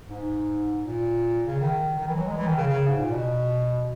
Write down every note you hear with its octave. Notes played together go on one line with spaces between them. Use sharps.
G#2
A#2
C#3
D#3
D#3
E3
F#3
G#3
E3
D#3
C#3
C#3
G#2
A#2
B2